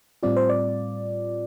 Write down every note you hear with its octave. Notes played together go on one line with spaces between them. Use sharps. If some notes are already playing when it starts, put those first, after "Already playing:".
A2 G3 C4 F4 D5
C5
D5